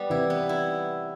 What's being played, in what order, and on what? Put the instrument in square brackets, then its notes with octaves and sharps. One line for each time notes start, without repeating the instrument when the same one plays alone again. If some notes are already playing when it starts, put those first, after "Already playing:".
Already playing: [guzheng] G3 B3
[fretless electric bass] C3 E3 [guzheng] E4
[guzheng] B3
E4